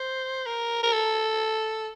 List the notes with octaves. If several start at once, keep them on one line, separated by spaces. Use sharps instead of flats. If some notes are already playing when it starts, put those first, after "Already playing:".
Already playing: C5
A#4
A#4
A4